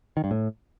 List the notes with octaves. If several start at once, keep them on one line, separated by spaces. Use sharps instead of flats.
D#3
G2
A2